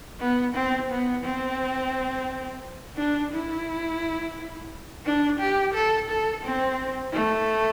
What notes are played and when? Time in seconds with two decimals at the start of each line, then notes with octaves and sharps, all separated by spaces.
0.20 B3
0.55 C4
0.90 B3
1.24 C4
2.97 D4
3.33 E4
5.05 D4
5.40 G4
5.74 A4
6.09 A4
6.44 C4
7.13 A3